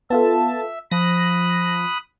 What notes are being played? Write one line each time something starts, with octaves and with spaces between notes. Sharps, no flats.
B3 F4 A4 E5 A5
F3 B5 D#6 F#6 A#6